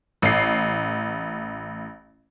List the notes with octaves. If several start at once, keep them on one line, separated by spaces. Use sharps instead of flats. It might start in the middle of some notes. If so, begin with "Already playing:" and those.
A1 C7